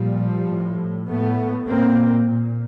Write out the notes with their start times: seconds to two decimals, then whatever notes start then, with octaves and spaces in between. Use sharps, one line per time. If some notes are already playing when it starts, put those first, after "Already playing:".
Already playing: A#2 F3 G3
0.49 A2
1.08 A2 A3 B3
1.67 A#2 A#3 C4
2.26 A#2